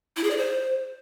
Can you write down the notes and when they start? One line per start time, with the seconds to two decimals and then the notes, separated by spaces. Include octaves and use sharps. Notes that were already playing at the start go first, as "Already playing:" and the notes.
0.17 E4
0.24 G#4
0.30 D5
0.37 C5